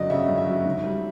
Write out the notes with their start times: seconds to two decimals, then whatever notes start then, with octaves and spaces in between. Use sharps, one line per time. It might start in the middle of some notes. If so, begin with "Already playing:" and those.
Already playing: G1 F#2 F#3 D5 D#5
0.10 C#3 E5
0.29 F#2
0.38 E5
0.46 F#3
0.65 G#2
0.84 G3